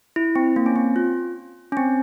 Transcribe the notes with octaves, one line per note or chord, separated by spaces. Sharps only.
E4
C4
A#3
C#4
C4
F4
C#4
C4